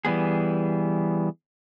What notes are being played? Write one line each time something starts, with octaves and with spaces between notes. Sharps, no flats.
E3 G3 B3 G#4